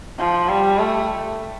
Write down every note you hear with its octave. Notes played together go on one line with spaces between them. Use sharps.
F3
G3
A3